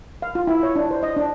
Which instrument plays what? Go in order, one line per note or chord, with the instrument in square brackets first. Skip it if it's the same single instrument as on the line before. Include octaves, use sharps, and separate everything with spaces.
[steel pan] F5
F4
E4
C#5
D4
C5
D#5
D4